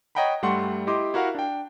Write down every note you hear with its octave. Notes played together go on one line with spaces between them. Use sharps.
C#5 D#5 F#5 G5 A#5 B5
G2 G3 A3 F#5 C6 C#6
E4 G4 D#5 C6 D6
E4 F#4 A#4 F5 F#5
D4 G5